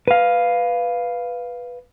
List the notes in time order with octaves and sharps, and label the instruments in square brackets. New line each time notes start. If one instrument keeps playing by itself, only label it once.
[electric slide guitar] B4 F5